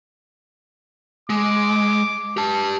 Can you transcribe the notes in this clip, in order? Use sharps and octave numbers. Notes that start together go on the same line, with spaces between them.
G#3 D6
G4 A5